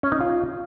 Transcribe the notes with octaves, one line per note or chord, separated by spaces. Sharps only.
C#4
D#4
F4